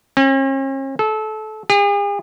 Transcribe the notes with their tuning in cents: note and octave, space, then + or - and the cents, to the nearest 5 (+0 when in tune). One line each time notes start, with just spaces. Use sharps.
C#4 -45
A4 -25
G#4 -45